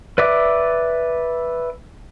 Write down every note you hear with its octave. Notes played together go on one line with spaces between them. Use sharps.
B4 D5 E5 D6